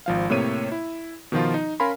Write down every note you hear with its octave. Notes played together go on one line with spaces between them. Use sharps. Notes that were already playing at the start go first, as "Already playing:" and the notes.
G#1 F3 F5
A2 C3 A#3 C#5 D#7
E4
B2 D#3 F3 F4
D#4
C#4 A#4 F5 G#5 B5 C6